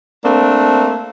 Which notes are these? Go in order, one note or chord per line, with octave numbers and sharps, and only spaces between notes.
A3 A#3 C4 D4